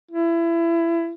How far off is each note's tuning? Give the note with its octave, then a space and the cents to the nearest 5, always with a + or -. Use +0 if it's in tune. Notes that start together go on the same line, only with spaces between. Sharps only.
E4 +25